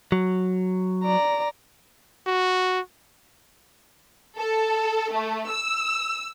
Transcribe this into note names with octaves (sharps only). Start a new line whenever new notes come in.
F#3
D5 A#5
F#4
A4
A3
E6